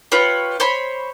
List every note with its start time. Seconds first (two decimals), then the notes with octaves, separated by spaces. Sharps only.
0.12 F4 G4 B4 C#5
0.60 C5 C#5 B5